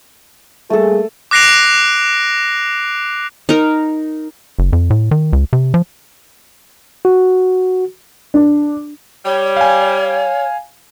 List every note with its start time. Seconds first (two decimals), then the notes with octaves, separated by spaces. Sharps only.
0.70 G3 A3 A#3 G#4 A4
1.31 D6 F#6 A#6 C7 D7 F7
3.49 D#4 A#4
4.59 F#1
4.73 F2
4.90 A2
5.11 D#3
5.33 C#2
5.53 C3
5.74 F3
7.05 F#4
8.34 D4
9.25 G3 C#5
9.57 F5 G#5